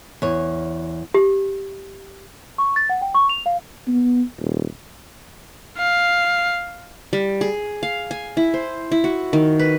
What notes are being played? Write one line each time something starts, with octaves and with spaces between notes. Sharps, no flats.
E2 C#5
G4
C#6
A6
F#5
G5
C#6
F7
F5
B3
D#1
F5
G3
G#4
F5
G#5
E4
C5
E4
F#4
D#3
B4